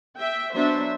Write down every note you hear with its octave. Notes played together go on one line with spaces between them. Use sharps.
E5 G5
F#3 B3 D4 C5 E5